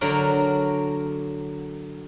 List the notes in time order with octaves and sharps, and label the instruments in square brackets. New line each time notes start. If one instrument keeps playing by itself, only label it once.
[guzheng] D3 F#3 F#4 A#4